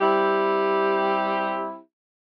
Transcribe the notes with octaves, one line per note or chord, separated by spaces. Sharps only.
G3 C4 E4 G4